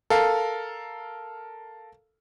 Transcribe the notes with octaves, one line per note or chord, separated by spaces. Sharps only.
A4 A#4 F5